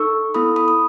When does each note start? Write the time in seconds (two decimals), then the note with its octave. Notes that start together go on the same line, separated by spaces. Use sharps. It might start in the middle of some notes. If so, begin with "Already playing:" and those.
Already playing: D#4 A4 C#6 E6
0.34 B3 E4 A4 B5 D#6
0.56 B5 D#6
0.68 D#6